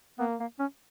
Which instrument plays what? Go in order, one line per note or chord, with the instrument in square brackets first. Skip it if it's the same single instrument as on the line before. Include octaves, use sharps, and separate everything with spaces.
[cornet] A#3 [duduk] B3
[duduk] A#3
C#4